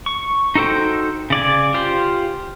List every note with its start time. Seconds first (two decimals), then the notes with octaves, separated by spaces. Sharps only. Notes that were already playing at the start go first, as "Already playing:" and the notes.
0.06 C#6
0.55 D#4 F#4 A4 C5 G5
1.30 C#3 D5 G#5
1.74 F4 G4 C5